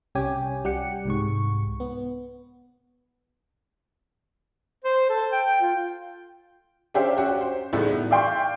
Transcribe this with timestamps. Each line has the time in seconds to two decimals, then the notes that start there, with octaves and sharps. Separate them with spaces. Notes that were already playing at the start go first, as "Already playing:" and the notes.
0.15 C2 C#4 G4 G#5
0.65 G3 G4 F#5 C#7
1.05 C2 G#2 C#6
1.80 B3
4.84 C5
5.10 A4
5.33 G5
5.47 G5
5.61 F4
6.94 C#4 D4 G4 C5 E5 F5
7.17 C#4 F#4 G4
7.41 C5
7.73 A2 G3 G#3 B3 D#4 E4
7.91 F#4
8.11 D5 E5 F5 G5 C6 C#6